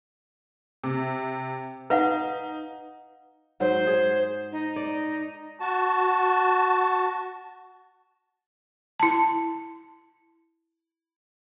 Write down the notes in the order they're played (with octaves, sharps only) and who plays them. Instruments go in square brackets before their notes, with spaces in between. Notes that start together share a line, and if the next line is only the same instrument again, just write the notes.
[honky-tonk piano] C3
[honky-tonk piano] D#4 [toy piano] B4 F5 F#5
[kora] G#2 F#3 [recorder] C5
[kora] G#4
[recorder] D#4
[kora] D5
[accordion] F#4 A5
[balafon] E4 A5